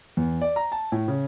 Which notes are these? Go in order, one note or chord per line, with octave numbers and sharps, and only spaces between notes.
E2
D5
A#5
A5
A2
C#3